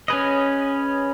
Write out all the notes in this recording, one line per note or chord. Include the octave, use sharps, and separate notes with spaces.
C#4 G#4 B4 D#5